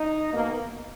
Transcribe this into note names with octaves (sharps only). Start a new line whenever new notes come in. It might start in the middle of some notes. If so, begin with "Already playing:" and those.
Already playing: D#4
B2 A#3